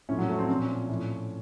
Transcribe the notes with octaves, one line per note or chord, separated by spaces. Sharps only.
A2 F3 C#4
F#3
A3
C4
A#2 F3 C#4
A2 F3